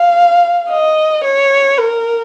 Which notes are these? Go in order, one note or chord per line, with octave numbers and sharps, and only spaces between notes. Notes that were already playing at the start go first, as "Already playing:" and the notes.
Already playing: F5
D#5
C#5
A#4